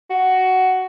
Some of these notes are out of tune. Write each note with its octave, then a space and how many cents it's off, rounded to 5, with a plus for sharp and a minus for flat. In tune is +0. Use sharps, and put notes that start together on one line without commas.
F#4 +10